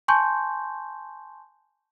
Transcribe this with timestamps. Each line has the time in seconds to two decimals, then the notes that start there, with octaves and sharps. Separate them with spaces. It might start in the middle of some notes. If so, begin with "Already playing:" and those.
0.08 G#5 A5 C6 C#6 G6